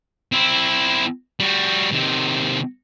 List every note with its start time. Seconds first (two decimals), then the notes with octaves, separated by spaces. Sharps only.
0.32 C4 E4
1.40 G3 F#4
1.92 C3 D#3